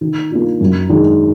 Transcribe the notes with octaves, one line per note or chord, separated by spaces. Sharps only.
D#3
A#3 D4 F4
F#2
D#3 G#3 D4